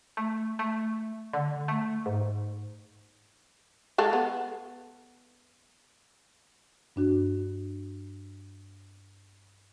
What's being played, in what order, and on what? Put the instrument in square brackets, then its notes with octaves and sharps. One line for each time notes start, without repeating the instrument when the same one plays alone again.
[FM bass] A3
A3
D3
A3
G#2
[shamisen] G#3 A4 F5
B3
[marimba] G2 D4 F#4